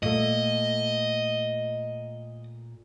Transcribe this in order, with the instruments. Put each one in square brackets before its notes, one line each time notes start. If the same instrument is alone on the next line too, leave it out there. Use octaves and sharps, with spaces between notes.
[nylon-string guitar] A#2 A3 [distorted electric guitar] D#5